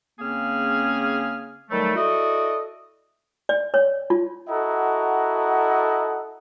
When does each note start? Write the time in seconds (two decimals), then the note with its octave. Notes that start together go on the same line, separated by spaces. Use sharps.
0.20 C#3 A#3 C4 C#4 G#4 F6
1.70 D#3 F#3 G3 A3
1.96 E4 F#4 A4 D5 D#5
3.49 D5
3.74 C#5
4.10 F4
4.49 E4 F#4 A4 D#5 F#5 A#5